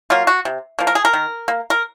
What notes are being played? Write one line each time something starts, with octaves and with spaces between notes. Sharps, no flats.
F#3 A#3 F4
F#4
C3
F3 A#3
A#4
G#4
A#4
D#3
A#3
A#4